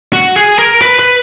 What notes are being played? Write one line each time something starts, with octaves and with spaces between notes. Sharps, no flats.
F#4
G#4
A#4
B4
B4